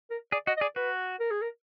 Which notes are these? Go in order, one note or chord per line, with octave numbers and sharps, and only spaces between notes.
A#4
G#4 D5
F#4 D#5
D#5
G#4 D5
F#4 B4
A#4
G#4
A#4